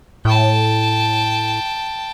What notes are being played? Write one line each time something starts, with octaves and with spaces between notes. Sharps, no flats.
A2 G5 A5